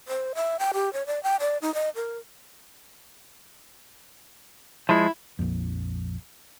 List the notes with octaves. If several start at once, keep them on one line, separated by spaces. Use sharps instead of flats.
C5
E5
G5
G4
C#5
D5
G5
D5
D#4
D#5
A#4
F3 G#3 E4
A#1 F2